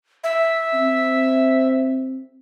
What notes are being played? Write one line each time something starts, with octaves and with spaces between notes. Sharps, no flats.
E5
C4